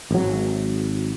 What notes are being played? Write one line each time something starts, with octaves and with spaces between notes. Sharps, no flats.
G#1 F#3